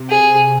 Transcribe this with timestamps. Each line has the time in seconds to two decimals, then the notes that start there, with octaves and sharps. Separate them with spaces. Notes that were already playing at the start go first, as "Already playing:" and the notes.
Already playing: C3
0.09 G#4